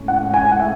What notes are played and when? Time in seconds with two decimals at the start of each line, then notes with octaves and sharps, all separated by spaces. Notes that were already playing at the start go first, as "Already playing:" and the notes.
Already playing: A2 G#3 C#4
0.08 F#5
0.34 G#5
0.52 F#5
0.60 E5